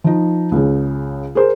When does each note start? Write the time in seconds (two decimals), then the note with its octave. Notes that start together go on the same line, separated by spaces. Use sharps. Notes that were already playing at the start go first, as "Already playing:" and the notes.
0.04 F3 D#4
0.52 C#2 C#3
1.35 G#4 A#4 C5